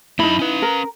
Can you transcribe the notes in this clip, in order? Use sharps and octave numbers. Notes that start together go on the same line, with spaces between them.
F#2 D#4 E4 B5
C#4 B4
A#4